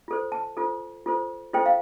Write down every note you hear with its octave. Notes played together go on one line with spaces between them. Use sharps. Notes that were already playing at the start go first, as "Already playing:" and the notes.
F4 A4 C5
A5
F4 A4 C5
F4 A4 C5
F4 A4 C5 G5
F5